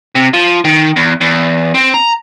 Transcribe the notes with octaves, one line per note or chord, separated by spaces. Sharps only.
C3
F3
D#3
E2
E2
C4
A#5